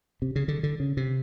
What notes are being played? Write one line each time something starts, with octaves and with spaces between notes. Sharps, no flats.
C3
C#3
D3
D3
C#3
C3